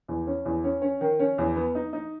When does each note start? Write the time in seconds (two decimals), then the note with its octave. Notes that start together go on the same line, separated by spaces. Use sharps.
0.08 E2
0.27 C#4
0.45 E2
0.64 C#4
0.82 C#4
1.01 D#3
1.19 C#4
1.38 E2
1.56 B3
1.75 D#4
1.93 D#4